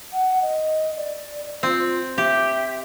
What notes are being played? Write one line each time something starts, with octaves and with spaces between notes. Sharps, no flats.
F#5
D#5
D5
C4 F4
G4 E5